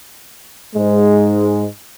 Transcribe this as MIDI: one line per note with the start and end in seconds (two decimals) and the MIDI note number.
0.75 1.67 44
0.75 1.67 56